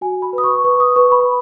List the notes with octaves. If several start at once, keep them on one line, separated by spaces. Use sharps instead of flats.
F#4 G#5
B5
B4
D#6
C#6
B4 C#6
D#6
B4 C#6
B5